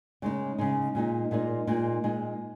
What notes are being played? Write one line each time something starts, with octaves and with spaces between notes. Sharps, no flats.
C#3 G#3 D#4
C#3 G#3 D#4
A#2 G#3 D#4
A#2 G#3 D#4
A#2 G#3 D#4
A#2 G#3 D#4